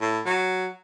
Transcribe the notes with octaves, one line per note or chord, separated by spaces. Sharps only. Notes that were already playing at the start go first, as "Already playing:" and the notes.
A2
F#3